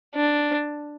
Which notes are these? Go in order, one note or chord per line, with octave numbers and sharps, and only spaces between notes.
D4